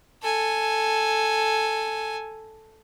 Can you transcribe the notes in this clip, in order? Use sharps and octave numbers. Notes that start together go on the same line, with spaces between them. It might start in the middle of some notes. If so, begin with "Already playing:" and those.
A4 G#5